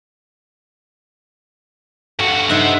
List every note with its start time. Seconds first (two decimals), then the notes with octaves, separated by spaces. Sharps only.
2.19 G2 F#4 A4
2.49 G2 D#4 C5 E5 F#5